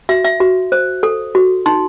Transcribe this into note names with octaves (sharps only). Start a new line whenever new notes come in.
F#4 E5
E5
F#4
C5
A4
F#4
D#4 C6